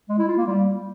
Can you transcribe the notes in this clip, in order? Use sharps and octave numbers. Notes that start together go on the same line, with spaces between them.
G#3
E4
F4
A#3
G3